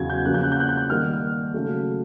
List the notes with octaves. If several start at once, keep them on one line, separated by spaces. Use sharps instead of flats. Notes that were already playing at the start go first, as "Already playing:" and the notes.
Already playing: E2 C#3 F#3 G#6
G6
C#3 F3 A#3 C#4 F#6
G6
F#6
G6
F#6
G6
F#6
D#3 G3 A#3 F6
C#3 F#3 A3